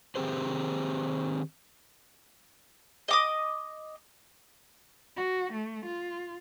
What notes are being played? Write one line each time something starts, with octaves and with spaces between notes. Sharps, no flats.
D#3 C4 G4 G#4 C5
D#5 D6 D#6
F#4
A3
F4